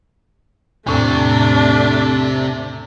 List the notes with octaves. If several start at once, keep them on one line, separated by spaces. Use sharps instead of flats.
E2 A2 C3 A3 D4 C#6